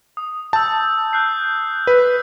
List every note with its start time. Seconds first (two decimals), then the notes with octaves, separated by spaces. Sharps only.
0.17 D#6
0.53 A5 E6 G6
1.13 F#6 G6 C7
1.87 B4